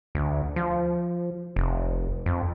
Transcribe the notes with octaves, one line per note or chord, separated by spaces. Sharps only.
D2
F3
F1
F2